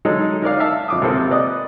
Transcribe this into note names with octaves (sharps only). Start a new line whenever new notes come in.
F#3 G#3 D#4 A4
D#4 A#4 D5 F5
E5 F5 A5
F2 D6 D#6
G#1 C3 F3 A#3 C4 A4
B4 D5 D#5 D#6